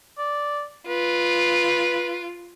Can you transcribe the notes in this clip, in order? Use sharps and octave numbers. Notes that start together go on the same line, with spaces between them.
D5
F4 B4